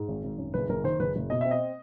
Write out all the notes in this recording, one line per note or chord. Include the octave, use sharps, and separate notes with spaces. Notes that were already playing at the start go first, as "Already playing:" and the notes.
Already playing: G#2
G#1
G#1
F#2
F#1 B4
F#1 A#4
D#3 C5
F#1 B4
F#1
B2 D#5
C4 E5
D#5